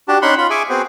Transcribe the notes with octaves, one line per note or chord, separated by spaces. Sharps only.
D4 F#4 G4 A5
C#4 D#4 F#5 B5 C6
F4 B5
G#4 E5 G#5 C#6 D6
B3 C4 F#4 G#4 C5